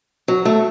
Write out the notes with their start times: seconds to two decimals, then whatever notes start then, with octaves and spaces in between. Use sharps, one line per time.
0.28 F#3
0.45 A3